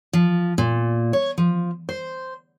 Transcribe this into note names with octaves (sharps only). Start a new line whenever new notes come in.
F3
A#2
C#5
F3
C5